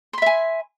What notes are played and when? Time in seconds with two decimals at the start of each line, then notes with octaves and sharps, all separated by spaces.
0.13 C6
0.18 B5
0.22 E5
0.26 G#5